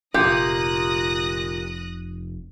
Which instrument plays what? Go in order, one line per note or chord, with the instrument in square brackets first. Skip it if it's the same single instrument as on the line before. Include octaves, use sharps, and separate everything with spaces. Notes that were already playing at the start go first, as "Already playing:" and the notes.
[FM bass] F1 [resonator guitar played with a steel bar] A#2 [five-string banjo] G4 [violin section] D#6 F#6 A#6